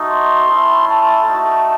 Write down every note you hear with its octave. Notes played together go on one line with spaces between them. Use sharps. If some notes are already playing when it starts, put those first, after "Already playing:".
Already playing: A3 D#4 F#4
C6
A3 C#4 E4
A5
A3 D#4 F#4